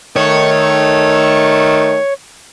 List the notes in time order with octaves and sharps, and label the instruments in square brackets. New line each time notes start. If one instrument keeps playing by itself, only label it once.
[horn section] D#3 A3 [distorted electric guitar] C#5